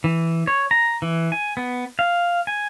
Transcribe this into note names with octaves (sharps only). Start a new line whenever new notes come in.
E3
C#5
A#5
E3
G#5
B3
F5
G#5